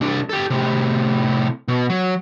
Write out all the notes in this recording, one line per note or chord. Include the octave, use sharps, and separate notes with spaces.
C2 D4
G4 A4
A2 C3
B2
F#3